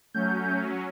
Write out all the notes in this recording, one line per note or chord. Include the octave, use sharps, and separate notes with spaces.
F#3 A3 C#4 G6